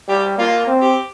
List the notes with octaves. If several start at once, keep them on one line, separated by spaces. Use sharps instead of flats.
G3 G4
A#3 F4
C4
G4